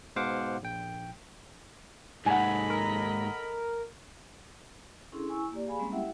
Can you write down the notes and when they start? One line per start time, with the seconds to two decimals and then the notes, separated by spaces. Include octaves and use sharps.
0.16 G#2 B2 C5 F5 F#5 D6
0.62 A#1 G5
2.26 D#2 G#2 A4 D#5 F#5 G#5 B5
2.70 A#4
5.12 C#4 D4 E4 G#4 A4 C6
5.28 E4 G#5 C#6 E6
5.51 A#3 G4 D5
5.67 G#4 F5 G#5 B5
5.79 G3 G#3 A#3 C4 C#4
5.92 E4 G4 E5 F#5 G5